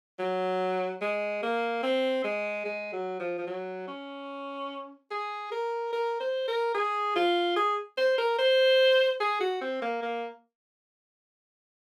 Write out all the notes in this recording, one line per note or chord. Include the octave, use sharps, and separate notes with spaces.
F#3
G#3
A#3
C4
G#3
G#3
F#3
F3
F3
F#3
C#4
G#4
A#4
A#4
C5
A#4
G#4
F4
G#4
C5
A#4
C5
G#4
F#4
C4
A#3
A#3